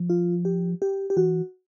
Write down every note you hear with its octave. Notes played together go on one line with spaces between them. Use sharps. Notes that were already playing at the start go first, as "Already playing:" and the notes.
Already playing: F3
F4
G4
G4
G4
E3 F#4